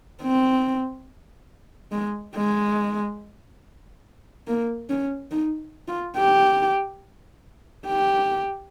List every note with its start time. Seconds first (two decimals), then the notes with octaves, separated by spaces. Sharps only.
0.22 C4
1.92 G#3
2.35 G#3
4.47 A#3
4.89 C#4
5.32 D#4
5.88 F4
6.17 G4
7.86 G4